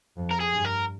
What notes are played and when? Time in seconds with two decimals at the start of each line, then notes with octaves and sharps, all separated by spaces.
0.17 F2
0.31 A#4
0.41 G#4
0.53 G2
0.65 A#4